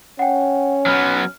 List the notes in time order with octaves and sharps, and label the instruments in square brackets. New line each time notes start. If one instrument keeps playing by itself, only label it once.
[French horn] C#4 [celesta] F#5 G5
[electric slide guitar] F#3 B3 [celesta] F6